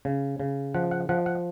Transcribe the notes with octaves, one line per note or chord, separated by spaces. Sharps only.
C#3
C#3
F3 F#5
F#5
F3 F#5
F#5